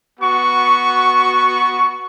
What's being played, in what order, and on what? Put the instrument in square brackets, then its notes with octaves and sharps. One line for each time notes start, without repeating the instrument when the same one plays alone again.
[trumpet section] B3 F#4 C#6